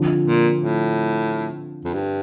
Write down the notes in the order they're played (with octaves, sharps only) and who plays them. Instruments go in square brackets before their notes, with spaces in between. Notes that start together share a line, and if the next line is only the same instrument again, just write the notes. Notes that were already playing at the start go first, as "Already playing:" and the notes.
Already playing: [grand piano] D3 F3 C4
[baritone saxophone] A#2
A2
F2
G2